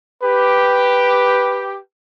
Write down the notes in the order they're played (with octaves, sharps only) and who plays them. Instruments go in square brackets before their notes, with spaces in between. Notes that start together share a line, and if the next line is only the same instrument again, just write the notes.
[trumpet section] G4 [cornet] B4